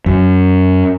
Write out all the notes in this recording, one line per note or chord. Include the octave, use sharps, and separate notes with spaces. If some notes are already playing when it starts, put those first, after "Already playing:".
F#2